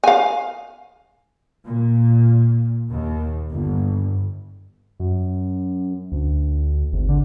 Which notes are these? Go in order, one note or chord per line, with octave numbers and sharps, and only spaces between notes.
F5 G#5
A#2
D#2
G1
F#2
D2
G#1
D3